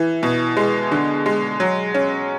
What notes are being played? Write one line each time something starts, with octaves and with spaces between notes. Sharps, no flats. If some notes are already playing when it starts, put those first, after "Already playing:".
Already playing: E3
B2
G#3
D3
G#3
F#3
C#4